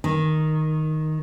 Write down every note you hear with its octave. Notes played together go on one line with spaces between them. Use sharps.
D#3